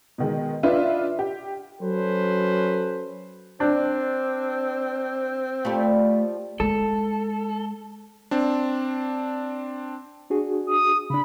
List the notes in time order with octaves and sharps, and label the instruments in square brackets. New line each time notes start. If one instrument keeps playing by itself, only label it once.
[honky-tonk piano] B2 D#3 G#3
D4 F4 B4 D#5 E5
G4
[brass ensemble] F#3 C#4 A4 B4 C5
[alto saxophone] C4 [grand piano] D4
[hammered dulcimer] F3 G3 [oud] A3 G4
[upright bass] G#3 [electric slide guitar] A4
[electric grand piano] C4 D4
[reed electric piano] D4 F#4 G#4
[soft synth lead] D#6
[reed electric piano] C#3 D4 [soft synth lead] B5